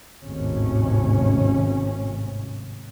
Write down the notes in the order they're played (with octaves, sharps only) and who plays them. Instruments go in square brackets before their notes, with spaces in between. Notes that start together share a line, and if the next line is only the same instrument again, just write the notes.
[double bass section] G#1 D#2 A2 C3 C#4